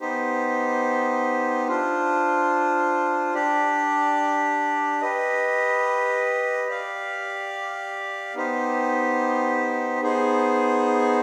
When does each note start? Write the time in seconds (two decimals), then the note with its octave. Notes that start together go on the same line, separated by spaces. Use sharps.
0.01 B3 D#4 G4 C5
1.67 D4 F4 C5
3.35 D4 G4 D5
5.01 G4 B4 D#5
6.68 G4 D5 F5
8.34 B3 D#4 G4 C5
10.01 B3 D#4 G#4 C5